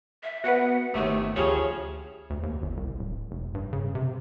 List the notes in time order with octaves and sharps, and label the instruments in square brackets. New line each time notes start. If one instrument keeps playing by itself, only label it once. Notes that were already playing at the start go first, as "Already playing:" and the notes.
[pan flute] E5
[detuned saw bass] B3 [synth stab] F#4 B4 [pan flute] F#5
[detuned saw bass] G1 [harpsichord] D#2 C3 [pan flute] A3
[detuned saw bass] D2 [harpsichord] C#3 F3 C#4 [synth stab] G4 C#5 [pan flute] G#4
[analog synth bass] D2
D#2
G1
C2
D1
F1
G2
C#3
C3